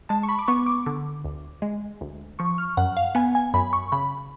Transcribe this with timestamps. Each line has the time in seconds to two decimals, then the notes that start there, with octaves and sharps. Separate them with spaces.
0.09 G#3 A5
0.23 C#6
0.29 B5
0.39 D6
0.48 B3 C#6
0.66 D6
0.86 D3
1.25 D2
1.62 G#3
2.01 D2
2.39 F3 C#6
2.58 F6
2.77 F#2 F#5
2.97 F5
3.15 B3 G#5
3.35 G#5
3.54 F#2 B5
3.73 C#6
3.92 C#3 B5